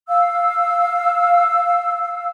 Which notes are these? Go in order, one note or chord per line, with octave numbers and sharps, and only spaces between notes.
F5 E6